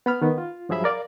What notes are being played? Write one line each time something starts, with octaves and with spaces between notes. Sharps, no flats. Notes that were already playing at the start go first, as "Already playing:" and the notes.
B3 B5 F6
D#3 B3
F4
G2 F3 F#3 G#4 E5 B5
A#4 D5 F5